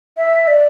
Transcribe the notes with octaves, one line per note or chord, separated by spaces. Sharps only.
E5
D5